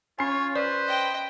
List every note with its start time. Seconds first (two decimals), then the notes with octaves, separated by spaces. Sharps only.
0.19 C#4 F4 C#5 G#5
0.56 B4 C5 D5
0.87 D#5 G5